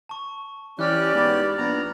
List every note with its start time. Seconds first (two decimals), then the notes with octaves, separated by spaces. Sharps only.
0.09 A5 C#6
0.79 E3 C#4 G4 D5 B5 F6 F#6
1.14 G#2 B3 G4
1.58 A#1 B3 A#5